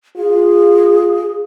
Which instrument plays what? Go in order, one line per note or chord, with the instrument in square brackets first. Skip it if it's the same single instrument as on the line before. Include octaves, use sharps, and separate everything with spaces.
[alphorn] F4 [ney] G#4